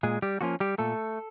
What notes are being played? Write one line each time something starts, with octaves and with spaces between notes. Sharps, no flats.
A#2 G#3 G#4
G3 G4
F3 A#3 C#4 F4 F#4
G3 G4
A#2 A3 A4